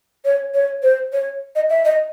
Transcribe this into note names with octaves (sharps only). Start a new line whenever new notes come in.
C#5
C#5
C5
C#5
D#5
E5
D#5